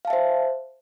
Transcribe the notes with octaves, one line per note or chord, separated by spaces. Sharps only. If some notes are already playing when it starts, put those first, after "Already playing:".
C5 E5 F5 A5